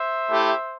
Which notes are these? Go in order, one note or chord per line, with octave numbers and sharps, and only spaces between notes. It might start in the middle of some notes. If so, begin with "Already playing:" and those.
Already playing: C5 E5
A3 E4 G4